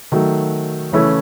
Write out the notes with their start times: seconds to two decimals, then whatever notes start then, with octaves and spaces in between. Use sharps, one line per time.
0.12 D#3 F#3 A3
0.92 C#3 E3 A3 C#4 E4